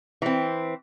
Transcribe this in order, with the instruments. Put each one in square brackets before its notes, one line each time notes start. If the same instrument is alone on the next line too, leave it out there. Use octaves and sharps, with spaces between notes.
[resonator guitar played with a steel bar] E3 C4